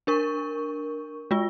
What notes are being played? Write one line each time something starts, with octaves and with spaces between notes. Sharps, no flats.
D4 A#4 C#6
G#3 F4